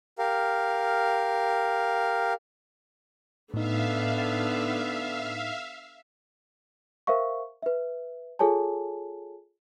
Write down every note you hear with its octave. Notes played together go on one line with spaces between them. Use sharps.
G4 A#4 F5
A2 D3 B3 D#4 E5 F5
A#4 C5 E5 F5 C#6
B4 E5
F4 G#4 A4 C#5 G#5 A5